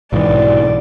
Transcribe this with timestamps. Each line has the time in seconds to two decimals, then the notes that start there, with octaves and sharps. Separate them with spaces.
0.13 B1 G#2 E3 D5